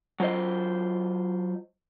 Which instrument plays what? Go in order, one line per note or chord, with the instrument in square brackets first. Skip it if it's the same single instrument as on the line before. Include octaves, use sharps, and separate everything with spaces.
[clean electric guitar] F#3 F4 C5 D#5